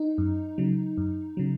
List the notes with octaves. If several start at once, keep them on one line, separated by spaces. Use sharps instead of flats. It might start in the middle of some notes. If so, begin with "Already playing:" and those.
Already playing: D#4
F#2
C#3 F#3
F#2
C#3 F#3